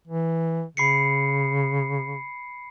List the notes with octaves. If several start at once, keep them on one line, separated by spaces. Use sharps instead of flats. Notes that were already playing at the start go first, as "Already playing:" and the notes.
E3
C#3 B5 C7 C#7